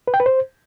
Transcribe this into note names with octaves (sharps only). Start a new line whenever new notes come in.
B4
G5
B4
C5